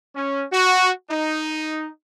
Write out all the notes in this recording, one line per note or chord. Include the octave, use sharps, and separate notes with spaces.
C#4
F#4
D#4